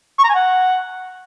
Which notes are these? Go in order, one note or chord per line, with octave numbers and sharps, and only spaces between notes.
C#6
A#5
G#5
F#5